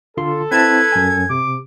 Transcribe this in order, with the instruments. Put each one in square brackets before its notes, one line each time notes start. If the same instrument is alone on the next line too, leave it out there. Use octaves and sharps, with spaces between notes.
[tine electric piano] D3 F4 C6 [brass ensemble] A4
[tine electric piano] C4 E4 A5 [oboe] B4 [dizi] G#6
[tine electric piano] F#2 G#5
[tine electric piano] C3 [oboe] D6